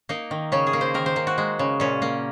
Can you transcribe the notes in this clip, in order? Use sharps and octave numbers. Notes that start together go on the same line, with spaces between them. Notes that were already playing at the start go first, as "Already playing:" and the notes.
A#3 D#4
D#3
C#3 C#4
G#4
A#3
C5
D#3 A#4
C5
A#3
F#4
G#3
C#3
A#2 C#4
A#3